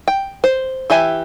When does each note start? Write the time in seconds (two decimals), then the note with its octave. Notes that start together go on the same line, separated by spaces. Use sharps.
0.07 G5
0.44 C5
0.90 E3 G4 E5 G#5